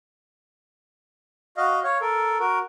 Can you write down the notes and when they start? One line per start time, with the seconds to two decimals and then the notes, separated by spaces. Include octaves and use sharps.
1.57 F#4 D#5 F5
1.84 C#5 F5 C#6
2.01 A4 A#4
2.39 F#4 A#4